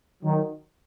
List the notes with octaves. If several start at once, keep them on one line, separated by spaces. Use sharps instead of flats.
D#3 F#3